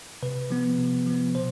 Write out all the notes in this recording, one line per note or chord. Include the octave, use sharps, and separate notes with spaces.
C3 B4
F3 B3
C3
F3 B3
B2 C5